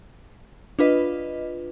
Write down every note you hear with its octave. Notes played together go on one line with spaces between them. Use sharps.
D4 F4 B4 D#5